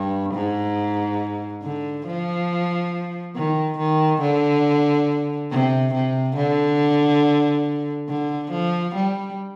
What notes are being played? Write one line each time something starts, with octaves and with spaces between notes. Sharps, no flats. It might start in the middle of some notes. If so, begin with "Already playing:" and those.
Already playing: G2
G#2
D3
F3
D#3
D#3
D3
C3
C3
D3
D3
F3
G3